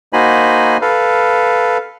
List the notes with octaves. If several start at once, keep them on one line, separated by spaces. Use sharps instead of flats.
A#3 D#4 F#4 C5 G#5 B5
A4 B4 F5